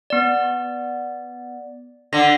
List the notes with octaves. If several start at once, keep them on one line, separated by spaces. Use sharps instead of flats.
B3 D5
D3 A#6